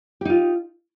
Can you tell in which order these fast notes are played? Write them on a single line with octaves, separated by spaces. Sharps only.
G4 D#4 F4